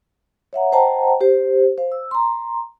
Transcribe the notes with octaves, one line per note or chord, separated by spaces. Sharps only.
C#5 E5 F#5 A#5
C5 D#5 F#5 G5 A5 A#5
G4 C5
C5 F5
E6
A#5 C6